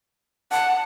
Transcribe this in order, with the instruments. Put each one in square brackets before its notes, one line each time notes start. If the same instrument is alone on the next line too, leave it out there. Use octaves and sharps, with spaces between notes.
[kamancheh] F#5 [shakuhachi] A5